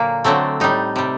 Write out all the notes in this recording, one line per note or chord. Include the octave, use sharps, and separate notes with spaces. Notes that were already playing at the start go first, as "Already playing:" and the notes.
Already playing: A#2 D3 F#3 A#3
D3 F#3 A3 C4
A2 G3 D#4
C3 G3